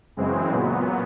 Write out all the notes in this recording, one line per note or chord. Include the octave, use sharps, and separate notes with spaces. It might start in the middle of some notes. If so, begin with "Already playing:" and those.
F#2 C#3 E3 G#3 C4
A#2 F#3 B3